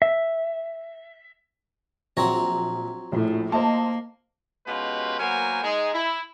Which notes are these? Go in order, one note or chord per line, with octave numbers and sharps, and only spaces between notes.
E5
A#1 F#3 C4 C#5 A#5
A#1 A2
A#3 C5 D#5 A5
B2 G#3 C#4 F4 G4 B4
F#3 A#3 B3 A#4 C5 G#5
G#3 D#4 G#4
E4